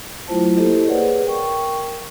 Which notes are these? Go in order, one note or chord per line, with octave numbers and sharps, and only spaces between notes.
F#3 A3 E4 F4 C5 A5
A#3 E4 G4 A4 C5 D#5
G#4 B4 C#5 D5 F#5
A#4 G5 C#6